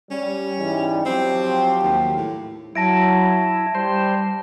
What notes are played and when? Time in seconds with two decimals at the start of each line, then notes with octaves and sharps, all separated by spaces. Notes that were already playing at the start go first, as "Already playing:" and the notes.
0.11 G3 C#4
0.59 G#2 E3 G3
1.06 F3 F#3 C4 G4
1.83 D#2
2.17 A2
2.75 F#3 E4 A5 A#6 D7
3.75 G3 C5